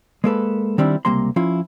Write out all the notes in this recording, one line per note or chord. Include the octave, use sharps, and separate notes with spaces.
G#3 A#3 A4 B4
D#3 G3 C4 D4 E4
C#2 C3 G3 A#3 A#5 C6
F3 C#4 E4 F4